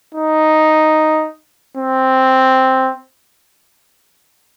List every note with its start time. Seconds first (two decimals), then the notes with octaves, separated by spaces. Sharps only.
0.15 D#4
1.77 C4